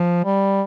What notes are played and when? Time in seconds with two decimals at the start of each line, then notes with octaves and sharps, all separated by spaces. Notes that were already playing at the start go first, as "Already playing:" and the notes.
Already playing: F3
0.25 G3